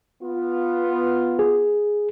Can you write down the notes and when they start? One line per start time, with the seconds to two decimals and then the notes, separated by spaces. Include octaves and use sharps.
0.23 B3 F4
1.39 G#4